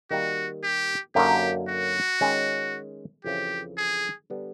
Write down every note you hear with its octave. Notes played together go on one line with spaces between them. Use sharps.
D#3 G3 A#3 F#4
G4
F#2 D3 F#3 A#3 D#4 G4
F#4
D#3 G#3 C#4
F2 C#3 E3 G4
G#4
D3 G3 B3 D4